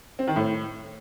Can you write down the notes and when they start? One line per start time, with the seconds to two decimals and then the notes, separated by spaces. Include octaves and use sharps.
0.19 C4
0.27 D#3
0.36 A2